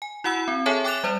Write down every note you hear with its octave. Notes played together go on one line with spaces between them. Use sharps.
G#5
E4 F#4 F#5 B5 E6
C4
G#4 A4 C#5 E5 G#5 A5
G5 D6 F#6 A6 E7 F7
G3 C5 D5